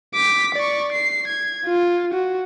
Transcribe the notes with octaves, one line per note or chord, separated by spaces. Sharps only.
D6 B6
D5 C#6
C7
G#6
F4
F#4